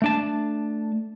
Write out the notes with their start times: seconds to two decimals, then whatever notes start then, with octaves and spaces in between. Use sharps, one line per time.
0.02 A3 D4 A5